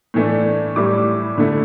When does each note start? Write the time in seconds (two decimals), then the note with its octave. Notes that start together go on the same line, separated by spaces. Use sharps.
0.14 A2 E3 A3 D4
0.76 A2 G3 E4 D6
1.38 D3 A3 E4